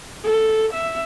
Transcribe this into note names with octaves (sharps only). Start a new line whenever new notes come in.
A4
E5